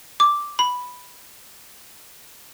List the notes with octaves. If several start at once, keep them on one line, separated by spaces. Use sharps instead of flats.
D6
B5